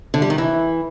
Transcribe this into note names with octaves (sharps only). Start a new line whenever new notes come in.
D3
G3
D#3
E3